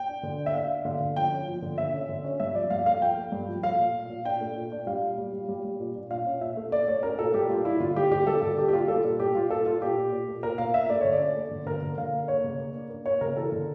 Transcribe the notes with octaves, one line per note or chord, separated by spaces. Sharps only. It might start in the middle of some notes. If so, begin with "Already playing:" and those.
Already playing: G5
D4
D3
D4
E5
D4 F5
D4
D3 F5
D3
F3 G5
C#4
F3
D3
D3 E5
C#4
D3
C#4
G2 E5
F3 D5
G2 F5
A3 F5
F3 G5
A3
G2
F3
A3 F5
A#2
A#2
A#2
D4 G5
A3
A#2
D4
G3 F5
A#2
G3
G3
G3
G3
A#2
D4
A#2 F5
C#4
A#2 E5
A3
A3 D5
A3 C#5
C#4 A#4
A#2 A4
G3 G4
G3 F4
D4 E4
D3 F4
G3 G4
D3 G4
G3 A4
D3 A4
A#3 G4
G4
A#3 F4
G3 A4
A#2
A#2 G4
G3 F4
A#3 A4
A#2 F4
A#2 G4
A#2
A#2
A3
A#2 A#4
A#2 F5
D4 E5
A3 D5
D3 C#5
D5
C#4
A3
D3
D3 A#4
D3
D3 F5
A3
A#3 C#5
C#3
A#3
D4
A#3
A#3 C#5
C#3 A#4
E3 A4
D3